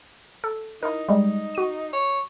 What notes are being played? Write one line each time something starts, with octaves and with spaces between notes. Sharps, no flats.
A4
D#4 E4 A#4
G3 G#3 D#4
F#4 D#7
C#5